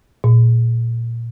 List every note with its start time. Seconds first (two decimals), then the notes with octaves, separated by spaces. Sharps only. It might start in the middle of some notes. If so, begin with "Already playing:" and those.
0.24 A#2